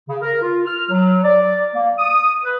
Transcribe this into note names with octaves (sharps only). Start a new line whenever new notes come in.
C#3
A#4
F4
F6
F#3
D5
A#3
D#6
B4